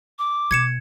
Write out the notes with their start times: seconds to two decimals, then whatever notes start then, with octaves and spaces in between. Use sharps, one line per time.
0.19 D6
0.51 B2 G#6 C#7 E7